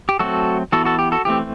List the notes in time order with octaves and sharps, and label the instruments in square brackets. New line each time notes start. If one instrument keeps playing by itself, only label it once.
[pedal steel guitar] G4
F#3 A3 C4 F#4 A4
E3 B3 F#4 A4
F#4 A4
G4
F#4 A4
E3 A3 C4 G4